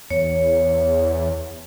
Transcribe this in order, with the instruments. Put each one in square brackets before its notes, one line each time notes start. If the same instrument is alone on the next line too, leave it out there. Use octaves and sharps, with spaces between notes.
[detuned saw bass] E2 [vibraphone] C#5